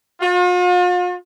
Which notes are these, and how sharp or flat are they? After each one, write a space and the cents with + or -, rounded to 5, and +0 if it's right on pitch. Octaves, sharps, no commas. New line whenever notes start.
F4 +45